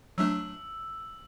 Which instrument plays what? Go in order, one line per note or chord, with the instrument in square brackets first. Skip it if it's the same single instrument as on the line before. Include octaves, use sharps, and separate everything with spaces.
[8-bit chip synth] F#3 A3 D4 [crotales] E6